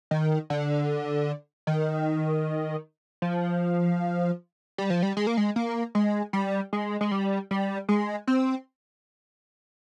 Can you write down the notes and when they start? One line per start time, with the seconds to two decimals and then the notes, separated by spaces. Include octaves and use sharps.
0.11 D#3
0.50 D3
1.67 D#3
3.22 F3
4.78 G3
4.90 F3
5.03 G3
5.17 G#3
5.27 A#3
5.37 G#3
5.56 A#3
5.95 G#3
6.33 G3
6.73 G#3
7.01 G#3
7.11 G3
7.51 G3
7.89 G#3
8.27 C4